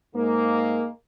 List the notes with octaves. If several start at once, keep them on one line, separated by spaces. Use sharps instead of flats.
G#2 G#3 A#3